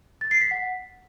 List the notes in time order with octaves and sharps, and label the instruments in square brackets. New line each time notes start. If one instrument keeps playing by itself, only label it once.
[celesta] A6
C7
B6
F#5